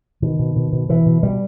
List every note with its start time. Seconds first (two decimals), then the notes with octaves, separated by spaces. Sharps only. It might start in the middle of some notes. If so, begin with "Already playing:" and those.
0.22 B2 D#3
0.39 B2
0.56 B2
0.73 B2
0.89 B2 E3
1.06 B2
1.23 B2 G3